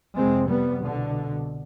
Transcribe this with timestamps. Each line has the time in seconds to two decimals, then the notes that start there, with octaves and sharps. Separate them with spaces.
0.16 F2 C3 G#3 C4
0.49 G3 B3
0.82 C2 B2 D3